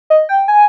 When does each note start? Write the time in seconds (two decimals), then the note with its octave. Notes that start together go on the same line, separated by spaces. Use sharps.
0.10 D#5
0.29 G5
0.48 G#5